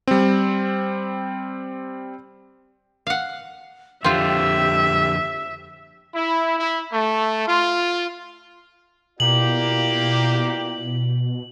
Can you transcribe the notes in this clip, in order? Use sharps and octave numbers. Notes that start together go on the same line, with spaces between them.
G3 C4
F5 F#5
F2 D3 C4 F4 G4 E5
E4
E4
A3
F4
B2 A#3 E4 F4 G4 D5 F#7